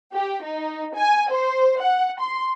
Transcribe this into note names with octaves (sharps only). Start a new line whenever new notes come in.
G4
D#4
G#5
C5
F#5
C6